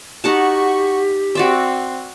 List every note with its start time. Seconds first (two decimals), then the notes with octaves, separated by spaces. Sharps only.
0.24 D#4 F#4 G4 F#5 A5 C#6
1.35 C4 F#4 D5 E5 C6